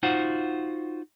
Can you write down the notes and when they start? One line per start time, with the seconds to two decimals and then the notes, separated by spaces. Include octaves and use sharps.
0.03 D#4 F4 F#4 C5 F#5